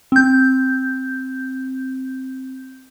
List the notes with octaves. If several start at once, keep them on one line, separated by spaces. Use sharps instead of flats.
C4 G6